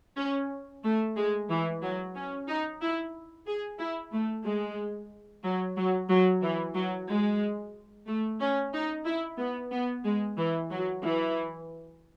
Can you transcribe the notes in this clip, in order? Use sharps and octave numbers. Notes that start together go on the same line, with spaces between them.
C#4
A3
G#3
E3
F#3
C#4
D#4
E4
G#4
E4
A3
G#3
F#3
F#3
F#3
E3
F#3
G#3
A3
C#4
D#4
E4
B3
B3
G#3
E3
F#3
E3